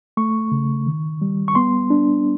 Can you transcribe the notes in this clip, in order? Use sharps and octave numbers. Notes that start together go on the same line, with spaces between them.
A3 C#6
C#3
D#3
G3
C#6
B3 C6
D4